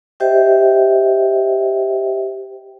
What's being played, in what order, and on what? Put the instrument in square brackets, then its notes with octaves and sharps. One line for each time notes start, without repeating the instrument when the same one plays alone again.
[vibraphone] G4 C5 D#5 E5 G5